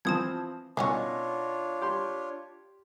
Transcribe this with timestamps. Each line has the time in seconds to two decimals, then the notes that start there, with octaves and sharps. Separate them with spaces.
0.05 E3 F3 C4 A5 D#6 G#6
0.77 B2 D#3 C#4 D4 F4 C#5 F#5 C#6
1.82 G4 C6